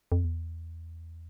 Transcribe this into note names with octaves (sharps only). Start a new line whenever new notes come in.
F2
E2